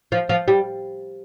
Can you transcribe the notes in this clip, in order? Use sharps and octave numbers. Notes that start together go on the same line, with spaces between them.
F3
F3
G3